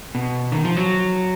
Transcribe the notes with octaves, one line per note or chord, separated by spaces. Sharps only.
B2
D#3
F3
F#3